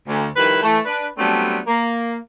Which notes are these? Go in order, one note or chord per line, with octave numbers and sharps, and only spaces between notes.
D2
D#3 F3 G3 E4 B4
E3 A3
D4 B4
F#3 G3 A3 B3 C4 D4
A#3